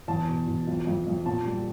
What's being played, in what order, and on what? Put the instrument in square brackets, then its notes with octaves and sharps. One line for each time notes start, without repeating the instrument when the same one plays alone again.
[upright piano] E2 A5
B2
E2
F2
F2
F2
A#2 A5
G3